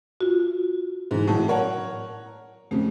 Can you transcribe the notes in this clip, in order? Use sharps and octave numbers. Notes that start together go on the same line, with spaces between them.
F4 F#4
G#2 E3
A2 F#3 A5
A#4 C#5 F#5
F2 C#3 A3